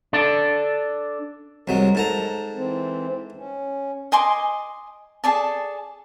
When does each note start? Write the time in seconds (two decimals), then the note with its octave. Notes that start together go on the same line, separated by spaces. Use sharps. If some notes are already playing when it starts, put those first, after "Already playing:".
0.13 D4 A4
1.68 C2 F#3 G#3 A#4
1.95 G#2 A4 A#5
2.55 E3 C4
3.35 C#4
4.12 D#5 G#5 C6 D6
5.24 G#4 A4 D5 A5